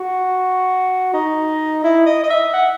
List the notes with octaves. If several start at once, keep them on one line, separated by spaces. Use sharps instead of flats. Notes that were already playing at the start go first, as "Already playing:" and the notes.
Already playing: F#4
D#4
E4
D#5
D#5
E5
F#5